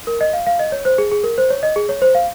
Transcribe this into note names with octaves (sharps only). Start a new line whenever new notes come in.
A#4
D#5
F5
F5
D#5
C#5
C5
G#4
G#4
A#4
C5
C#5
D#5
G#4
C#5
C5
F5